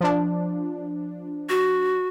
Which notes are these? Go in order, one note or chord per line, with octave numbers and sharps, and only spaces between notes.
F3 D4
F#4